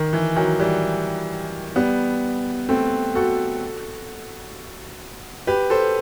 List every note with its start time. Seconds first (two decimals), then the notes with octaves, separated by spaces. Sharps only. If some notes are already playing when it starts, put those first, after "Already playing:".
Already playing: D#3
0.13 E3
0.36 D#3 F#3
0.59 E3 G3
1.76 G3 B3
2.69 A3 C4
3.15 F#4 A4
5.47 G4 B4
5.70 A4 C5